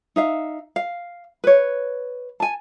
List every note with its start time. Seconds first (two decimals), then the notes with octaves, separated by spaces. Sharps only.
0.16 D#4 E5 F5
0.76 F5
1.44 B4 C#5
2.40 G#5 A5